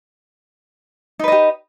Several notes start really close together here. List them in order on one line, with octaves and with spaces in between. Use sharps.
D#4 B4 D#5 G4